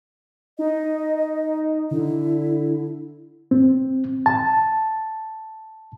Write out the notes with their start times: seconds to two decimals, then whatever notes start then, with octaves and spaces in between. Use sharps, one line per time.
0.59 D#4 D#5
1.91 D3 E4
3.51 C4
4.26 A5